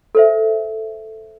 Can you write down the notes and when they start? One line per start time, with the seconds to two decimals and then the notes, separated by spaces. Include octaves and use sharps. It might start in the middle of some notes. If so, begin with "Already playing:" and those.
0.15 A4 C5 E5